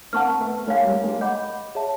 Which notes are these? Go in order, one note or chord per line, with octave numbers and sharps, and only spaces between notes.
A#3 C4 F#5 A5 C#6 F6
A3 B3
G#3 A#3 A#4 C#5 F5 G#5
G3 A3
G#3 A#3
D#5 F#5 B5 D6 G6
G#4 C#5 E5 A5